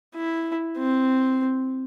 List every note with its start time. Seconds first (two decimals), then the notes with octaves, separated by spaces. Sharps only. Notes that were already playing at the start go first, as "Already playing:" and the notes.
0.16 E4
0.78 C4